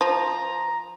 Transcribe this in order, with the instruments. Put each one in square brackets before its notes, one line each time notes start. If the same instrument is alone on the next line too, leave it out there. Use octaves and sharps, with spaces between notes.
[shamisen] F3 [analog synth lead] A#5